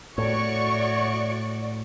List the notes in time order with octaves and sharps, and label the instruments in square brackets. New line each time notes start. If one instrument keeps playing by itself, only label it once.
[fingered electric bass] A2 [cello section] F#4 D5 [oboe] C#5 [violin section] C#6